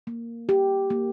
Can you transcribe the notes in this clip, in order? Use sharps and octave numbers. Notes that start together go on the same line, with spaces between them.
A#3
G4
A#3